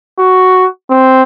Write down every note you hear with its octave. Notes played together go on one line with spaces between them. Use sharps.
F#4
C4